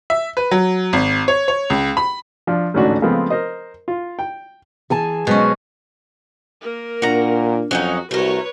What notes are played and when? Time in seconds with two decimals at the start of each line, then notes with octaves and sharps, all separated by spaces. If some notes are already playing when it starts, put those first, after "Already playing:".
0.10 E5
0.37 B4
0.51 F#3
0.93 G#1
1.28 C#5
1.48 C#5
1.70 C#2
1.97 B5
2.47 F3 D4
2.74 A1 D2 G#2 C#4 D4 F#4
3.02 C#3 F3 G#3 A3 B3 C4
3.30 A#4 C5 D#5
3.88 F4
4.19 G5
4.90 E3 G#4 G#5 A5
5.27 B2 F#3 G#3 C#4 C5
6.61 A#3 A#4
7.02 A#2 D4 F#4 A#5
7.71 F2 F#3 C#4 D#4 F#4
8.11 C2 A3 F#4 A#4 B4 C#5